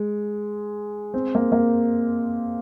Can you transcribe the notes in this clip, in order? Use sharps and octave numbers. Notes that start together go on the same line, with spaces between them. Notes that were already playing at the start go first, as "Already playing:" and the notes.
Already playing: G#3
C4
A#3
A#3